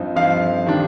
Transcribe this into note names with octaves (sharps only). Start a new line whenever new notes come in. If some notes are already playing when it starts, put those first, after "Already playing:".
Already playing: G2 F3 C4 D#4
G2 F3 C4 D#4 F5
D#3 G3 D4